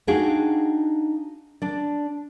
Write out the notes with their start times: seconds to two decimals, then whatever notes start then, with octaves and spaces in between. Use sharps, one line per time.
0.07 D4 D#4 F#4 G#4 F5 G5
1.62 D4 D5